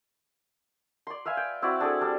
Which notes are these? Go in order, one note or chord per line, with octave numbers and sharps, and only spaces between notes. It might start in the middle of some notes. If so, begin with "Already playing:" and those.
D5 C6
B4 E5 F5 G#5
G5
C4 E4 F#4 D5
D4 G#4 A4
G3 D4